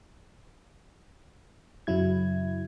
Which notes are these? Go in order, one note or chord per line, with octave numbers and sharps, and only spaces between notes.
F#2 C#3 F#3 E4 G#6